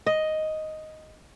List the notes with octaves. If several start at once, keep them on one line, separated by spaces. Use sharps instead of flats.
D#5